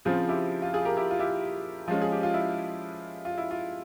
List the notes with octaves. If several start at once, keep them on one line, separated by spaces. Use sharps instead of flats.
C#3 F3 C4 F4 G#4
E4 G4
F4
F4 G#4
G4 A#4
E4 G4
F4
E4 G4
F3 G#3 C#4 F4
G#4
G4
F4
E4
F4
E4
F4